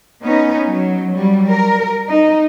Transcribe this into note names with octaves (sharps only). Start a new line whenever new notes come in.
B3 C#4 D#4
F#3
F#3 G3
A#4
D#4